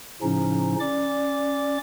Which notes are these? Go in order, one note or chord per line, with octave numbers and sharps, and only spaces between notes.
A2 C#3 F3 C#4 D#4
C#4 D5 D6